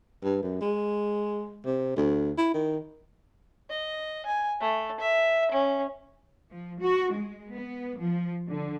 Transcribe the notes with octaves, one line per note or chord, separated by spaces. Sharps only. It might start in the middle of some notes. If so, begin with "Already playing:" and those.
G2
F#2
G#3
C3
D2
E4
D#3
D#5
G#5
A3
E5
C#4
F3
F#4
G#3
B3
F3
D3